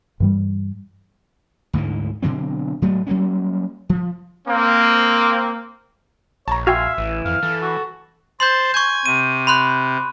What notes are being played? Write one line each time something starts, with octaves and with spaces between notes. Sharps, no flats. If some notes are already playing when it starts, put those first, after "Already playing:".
G2 E3 G3
D2 G#2 D3 E3
B2 D3 F#3 C4
A2 F#3 G#3 A3
F#3 G3 A#3 C#4
F3
A#3 C4
A#1 C#5 A5 A#5
F#4 E5 F5 G5 G#5 C6
A1 E3
F2 F5
E3 A4
F#4
C5 A5 C6 G6
G#5 C#6 G6 G#6
C3 D#7
B5 C6 F#6